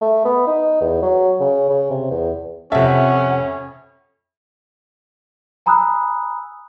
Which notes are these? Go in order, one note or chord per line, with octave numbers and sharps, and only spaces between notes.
A3
B3
D#4
E2
F#3
C#3
C#3
C3
E2
F2 C3 C#4 A4 E5 F#5
G#5 A#5 B5 D#6 E6 F#6